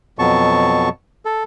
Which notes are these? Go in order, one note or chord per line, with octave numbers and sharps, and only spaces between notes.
F2 B2 F#3 A5 C#6
A4